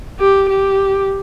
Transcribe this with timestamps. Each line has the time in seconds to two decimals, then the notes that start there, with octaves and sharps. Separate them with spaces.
0.19 G4
0.49 G4